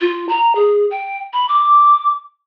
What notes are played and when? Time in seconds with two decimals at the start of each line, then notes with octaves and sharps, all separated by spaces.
0.01 F4
0.29 A#5
0.55 G#4
0.91 G5
1.33 B5
1.49 D6